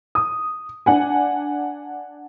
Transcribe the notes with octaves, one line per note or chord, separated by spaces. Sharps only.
D#6
D4 F#5 G#5